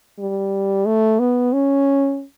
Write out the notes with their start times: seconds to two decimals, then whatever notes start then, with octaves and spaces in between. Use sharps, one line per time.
0.19 G3
0.86 A3
1.20 B3
1.53 C#4